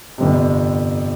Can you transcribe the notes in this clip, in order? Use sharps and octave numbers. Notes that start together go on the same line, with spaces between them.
G1 F2 C3